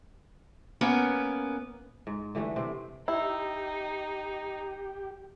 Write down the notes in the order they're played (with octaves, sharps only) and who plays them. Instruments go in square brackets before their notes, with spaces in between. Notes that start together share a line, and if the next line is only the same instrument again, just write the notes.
[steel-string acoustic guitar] A#3 B3 C#4 A#4 B4
[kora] G#2
D3 E3 G3 A3
C3 C4
[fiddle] D#4 [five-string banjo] E4 [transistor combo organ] G4